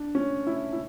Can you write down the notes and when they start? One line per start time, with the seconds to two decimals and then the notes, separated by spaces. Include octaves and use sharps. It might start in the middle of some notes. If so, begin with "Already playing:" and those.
Already playing: D4
0.15 C#4
0.47 E4
0.73 E4